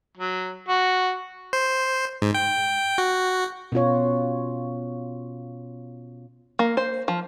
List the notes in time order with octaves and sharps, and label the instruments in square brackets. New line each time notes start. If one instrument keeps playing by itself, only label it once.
[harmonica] F#3
F#4
[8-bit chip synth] C5
G#2
G5
F#4
[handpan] B2 C#4 F4 C#5
[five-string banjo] A#3
C5
F3